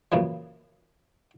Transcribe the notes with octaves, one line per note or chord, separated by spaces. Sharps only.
F#2 A#2 C#3 E3 F3